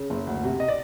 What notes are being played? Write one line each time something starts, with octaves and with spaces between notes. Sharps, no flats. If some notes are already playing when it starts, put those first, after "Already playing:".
Already playing: C#3
F#1
D2
C3
D#5
D5